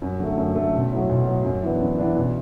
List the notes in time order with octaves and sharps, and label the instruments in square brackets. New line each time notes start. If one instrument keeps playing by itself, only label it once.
[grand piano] F#2
D3 A3
F#2
D3 A3
B1
A2 F#3
B1
A2 F#3
F#2
E3 B3 D4
F#2
E3 B3 D4
B1